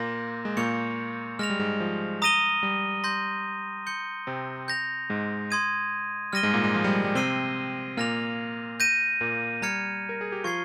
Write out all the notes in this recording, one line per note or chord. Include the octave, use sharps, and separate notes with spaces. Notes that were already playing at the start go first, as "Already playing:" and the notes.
Already playing: A#2 A#3 C6 G6 A#6
G#3
A#2 A#3 C#6 G6 C#7 F7
G#3 F6 A#6 F7
G3
G#2 G#3
F3
A#5 D#6 A#6 D#7 G7
G3
C6 G6 A#6
C6 G6 C#7 G7
C3 C4
G6 A#6 F7
G#2 G#3
C6 D#6 G#6 D#7
G3 F6 A#6 D#7 G7
G#2 G#3
A#2 A#3
G#2 G#3
F3
G3
G3
C3 C4 F6 C7 D#7 G7
A#2 A#3 F6 A#6 F7
G6 A#6 D#7
A#2 A#3
G3 A#5 F6 G#6 C#7
A#4
G#4
G4
F3 F4 C#6 G#6 C7 G7